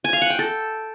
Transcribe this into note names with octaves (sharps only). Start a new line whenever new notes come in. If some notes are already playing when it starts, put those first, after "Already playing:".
G#5
F5
F#5
G5
A4